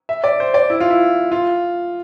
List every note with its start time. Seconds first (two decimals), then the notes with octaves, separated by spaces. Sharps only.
0.09 E5
0.24 D5
0.40 C5
0.54 D5
0.70 E4
0.80 F4
0.90 E4
1.32 F4